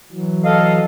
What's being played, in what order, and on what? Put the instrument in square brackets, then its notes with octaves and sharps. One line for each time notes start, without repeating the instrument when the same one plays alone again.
[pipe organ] E3 F#3
[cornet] A4 [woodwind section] D#5 F5